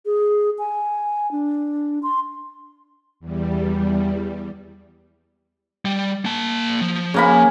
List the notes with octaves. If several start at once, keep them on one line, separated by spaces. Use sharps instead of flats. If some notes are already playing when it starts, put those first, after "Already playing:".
G#4
G#5
D4
C6
E2 G3
G3
A#3 A5
F3
C#3 A#3 B5